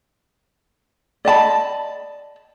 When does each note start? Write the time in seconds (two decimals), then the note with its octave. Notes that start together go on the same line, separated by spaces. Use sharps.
1.25 D5 D#5 A5 B5